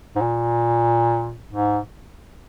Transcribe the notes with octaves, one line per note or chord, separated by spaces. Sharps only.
G#2
A#2
G#2